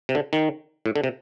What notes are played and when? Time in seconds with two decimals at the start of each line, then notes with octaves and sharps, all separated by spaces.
0.09 C3
0.15 D3
0.33 D#3
0.86 A2
0.96 D3
1.04 C3